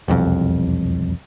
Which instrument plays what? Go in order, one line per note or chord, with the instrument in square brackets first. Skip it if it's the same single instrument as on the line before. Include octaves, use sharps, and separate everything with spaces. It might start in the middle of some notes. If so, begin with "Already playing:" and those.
[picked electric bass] E1 C2 F2